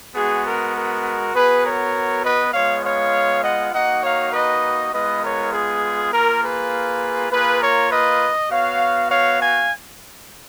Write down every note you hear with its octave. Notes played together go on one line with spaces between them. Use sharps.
G#3 B3 F#4 G#4
A#4
A#4
B3 F#4 G#4 B4
A#4 C#5
B4 D#5
G#3 B3 F4 C#5 F5
C#5 F5
D#5 F#5
A#3 D#4 F#4 D#5 F#5
C#5 F5
B4 D#5
G#3 B3 F4 B4 D#5
A#4 C#5
G#4
A#3 F4 A#4
G#4 B4
A#3 F4 G#4 B4
A#4 C#5
B4 D#5
B3 F#4 C#5 F5
C#5 F5
F5 G#5